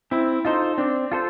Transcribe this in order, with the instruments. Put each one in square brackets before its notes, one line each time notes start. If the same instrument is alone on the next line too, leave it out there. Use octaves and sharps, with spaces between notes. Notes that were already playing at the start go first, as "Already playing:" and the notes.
[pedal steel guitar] C4 [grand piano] E4
[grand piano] D#4 [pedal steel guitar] F4 A4 C5
[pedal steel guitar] C4 [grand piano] D4
[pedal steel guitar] F4 A4 C5